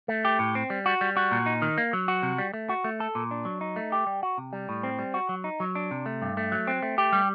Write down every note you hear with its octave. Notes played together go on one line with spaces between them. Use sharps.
A3
G4
A2
C4
G3
F#4
G3
F#4
A#2
D#4
D#3
A#3
F#3
F#4
C3
G3
A3
F#4
A3
A4
A#2
D4
F#3
D#4
A3
G4
G3
F#4
C3
G3
A2
C4
G3
F#4
F#3
D#4
F#3
D4
C3
A3
G2
A3
F#3
C4
A3
G4
G3